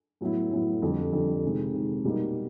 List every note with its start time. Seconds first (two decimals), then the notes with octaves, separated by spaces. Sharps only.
0.21 A2 F#3 B3 E4
0.51 A2 F#3 B3 E4
0.82 F2 D3 G3
1.12 F2 D3 G3
1.44 C3 D#3 G#3
1.74 C3 D#3 G#3
2.05 B2 G3 A#3 D#4